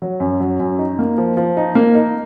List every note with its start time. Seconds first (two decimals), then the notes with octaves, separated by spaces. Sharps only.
0.02 F#3
0.20 F#2
0.40 F#3
0.60 F#2
0.79 D#4
0.99 A#3
1.18 F3
1.37 F3
1.57 D#4
1.75 A#3
1.95 D#4